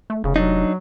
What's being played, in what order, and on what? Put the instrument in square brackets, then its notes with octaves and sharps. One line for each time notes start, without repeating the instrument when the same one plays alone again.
[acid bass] A3
[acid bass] F1 [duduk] C#3
[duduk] F#3 [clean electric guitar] D4 D#4